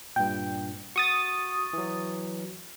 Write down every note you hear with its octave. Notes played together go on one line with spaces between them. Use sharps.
G2 A#2 G5
F#4 C#6 D#6 A6
E3 F#3